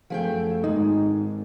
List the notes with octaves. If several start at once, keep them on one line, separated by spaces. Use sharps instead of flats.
F#2 F3 A3 G#4 G5
G#1 G#2 G#3 D#4